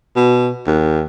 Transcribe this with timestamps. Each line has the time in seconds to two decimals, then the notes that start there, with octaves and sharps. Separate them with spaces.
0.16 B2
0.67 D#2